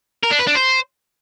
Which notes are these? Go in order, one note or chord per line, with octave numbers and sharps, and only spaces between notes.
A#4
D4
B4
D4
C5